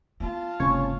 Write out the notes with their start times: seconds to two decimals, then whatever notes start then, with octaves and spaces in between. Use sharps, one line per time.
0.20 B3 F4 A5
0.60 F#1 G#2 C3 C#4 C#5